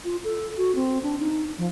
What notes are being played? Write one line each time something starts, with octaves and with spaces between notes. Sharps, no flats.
F4
A4
F#4
C4
D4
D#4
F3